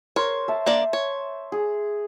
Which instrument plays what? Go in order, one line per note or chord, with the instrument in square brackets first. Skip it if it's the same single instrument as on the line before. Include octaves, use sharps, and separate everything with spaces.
[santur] A#4 C5 [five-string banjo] C#5
[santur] E5 A5
[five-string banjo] A#3 D4 D5
C#5
[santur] G#4